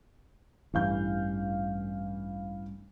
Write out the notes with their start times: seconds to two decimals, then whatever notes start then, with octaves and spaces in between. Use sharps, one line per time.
0.74 A1 G2 E3 F5 G6